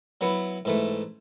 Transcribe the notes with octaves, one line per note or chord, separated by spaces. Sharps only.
F#3 B3 E4
G#2 E3 A3